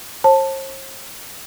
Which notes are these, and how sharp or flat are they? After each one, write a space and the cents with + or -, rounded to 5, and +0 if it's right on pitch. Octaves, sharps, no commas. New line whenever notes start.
C5 +45 A5 +5